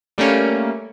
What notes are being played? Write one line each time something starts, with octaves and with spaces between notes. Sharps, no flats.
G3 A3 A#3 C#4